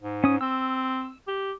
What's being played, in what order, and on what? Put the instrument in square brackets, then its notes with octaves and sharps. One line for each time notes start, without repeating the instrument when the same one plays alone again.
[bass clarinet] G#2
[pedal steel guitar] C#4 D#6
[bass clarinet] C4 [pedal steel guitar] E6
[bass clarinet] G4